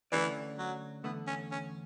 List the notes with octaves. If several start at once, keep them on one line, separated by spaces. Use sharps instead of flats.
D3 E3 A3 C#4 G4 D5
F#3
E2 D3 A3 B3
C#4
C#4